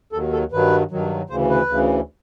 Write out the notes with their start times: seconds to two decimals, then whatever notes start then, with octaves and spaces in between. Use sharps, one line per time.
0.12 D#2 D#3 F#3 A4
0.32 A4
0.52 G2 D#3 F#3 B4
0.91 G2 D#3 F#3
1.30 D2 C#3 E3 C5
1.49 B4
1.69 D2 C#3 E3